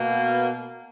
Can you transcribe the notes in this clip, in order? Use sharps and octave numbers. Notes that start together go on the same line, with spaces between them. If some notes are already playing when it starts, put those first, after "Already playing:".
Already playing: B2 A#3